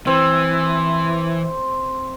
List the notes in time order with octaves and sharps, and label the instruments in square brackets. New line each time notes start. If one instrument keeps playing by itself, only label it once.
[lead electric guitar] E3 [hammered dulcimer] C4